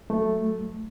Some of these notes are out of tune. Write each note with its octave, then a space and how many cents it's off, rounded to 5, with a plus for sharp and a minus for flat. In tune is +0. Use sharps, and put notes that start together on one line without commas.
F#3 +0 A3 +0